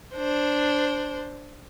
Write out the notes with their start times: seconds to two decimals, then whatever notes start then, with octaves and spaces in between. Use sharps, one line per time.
0.15 D4 C5